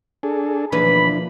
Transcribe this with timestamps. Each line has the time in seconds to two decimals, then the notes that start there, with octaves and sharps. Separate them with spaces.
0.23 D4 G#4 A4
0.72 D#2 B2 E3 F3 A#3 D4 B4 B5